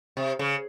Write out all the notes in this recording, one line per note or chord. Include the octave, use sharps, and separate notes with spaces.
C3
C#3